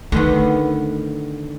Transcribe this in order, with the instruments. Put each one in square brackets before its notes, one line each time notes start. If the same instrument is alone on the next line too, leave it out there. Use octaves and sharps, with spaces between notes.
[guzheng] D3 D#3 B3 [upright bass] A3